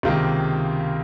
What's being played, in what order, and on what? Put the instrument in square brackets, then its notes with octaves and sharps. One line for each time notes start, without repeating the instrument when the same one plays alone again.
[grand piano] C#2 C3 D#3 A#3 F4